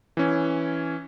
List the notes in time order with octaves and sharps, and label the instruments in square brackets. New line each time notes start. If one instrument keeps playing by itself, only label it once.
[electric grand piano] E3 C#4